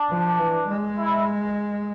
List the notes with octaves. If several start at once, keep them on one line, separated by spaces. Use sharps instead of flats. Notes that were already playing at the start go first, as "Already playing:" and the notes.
Already playing: D4
F3
E3
G#3
E4